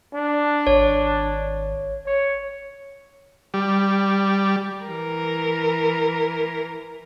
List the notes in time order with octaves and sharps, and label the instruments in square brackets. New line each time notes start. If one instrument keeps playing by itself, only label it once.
[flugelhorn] D4
[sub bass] G#1 [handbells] C#5
[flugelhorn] C#5
[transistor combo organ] G3
[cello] E3 A#4